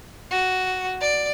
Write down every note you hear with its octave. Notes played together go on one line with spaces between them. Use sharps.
F#4
D5